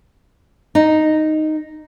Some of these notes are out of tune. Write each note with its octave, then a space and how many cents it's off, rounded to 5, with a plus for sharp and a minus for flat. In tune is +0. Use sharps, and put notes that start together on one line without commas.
D#4 -5